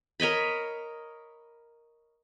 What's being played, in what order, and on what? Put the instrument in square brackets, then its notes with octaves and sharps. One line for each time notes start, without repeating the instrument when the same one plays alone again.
[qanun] A#4 C#5 D#5 B5